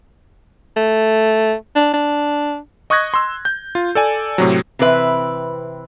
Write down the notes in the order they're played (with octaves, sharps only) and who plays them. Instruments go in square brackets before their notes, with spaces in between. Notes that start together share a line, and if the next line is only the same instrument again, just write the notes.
[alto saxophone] A3
D4
D4
[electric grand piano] D#5 C#6 D#6 F#6 G#6 A#6
C6 E6
G6
F4
A4 D5 G#5
A2 C3 F#3
[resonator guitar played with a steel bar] C3 E3 C4 B4 E5